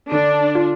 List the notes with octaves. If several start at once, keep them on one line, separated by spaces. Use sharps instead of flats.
D3 D4
F4